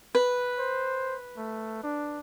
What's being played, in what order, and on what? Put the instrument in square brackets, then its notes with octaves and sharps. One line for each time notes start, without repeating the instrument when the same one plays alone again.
[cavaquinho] B4
[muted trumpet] C5
A3
D4